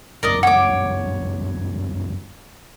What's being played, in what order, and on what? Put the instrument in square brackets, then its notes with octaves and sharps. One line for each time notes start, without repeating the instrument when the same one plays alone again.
[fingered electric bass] G1 C#2 F#2 [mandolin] A#4 D5 D#5
[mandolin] C#5 D6 [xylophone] F#5